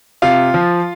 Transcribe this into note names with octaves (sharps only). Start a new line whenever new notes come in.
C3 F4 F5
F3